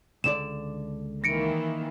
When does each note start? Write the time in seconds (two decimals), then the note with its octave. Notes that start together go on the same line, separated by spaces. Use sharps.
0.24 C#2 D3 D5 E7
1.24 D#3 E3 A#3 A#6 C#7 D7